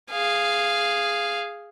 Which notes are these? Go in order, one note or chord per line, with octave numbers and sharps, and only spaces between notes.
G#4 F5